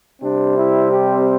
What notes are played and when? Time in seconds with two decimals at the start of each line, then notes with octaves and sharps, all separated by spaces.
0.22 C3 G3 C4 D4
0.56 E4
0.89 G4